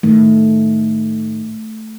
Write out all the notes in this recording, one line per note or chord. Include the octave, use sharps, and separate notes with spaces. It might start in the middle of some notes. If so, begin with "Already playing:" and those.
A2 D#3 A3